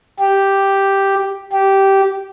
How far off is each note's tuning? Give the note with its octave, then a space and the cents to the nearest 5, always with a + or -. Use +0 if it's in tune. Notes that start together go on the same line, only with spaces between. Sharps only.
G4 +0
G4 -10